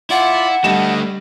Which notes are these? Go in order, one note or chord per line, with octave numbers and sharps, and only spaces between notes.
E4 F4 D5 F#5
G3 A3 D4 D#5 E7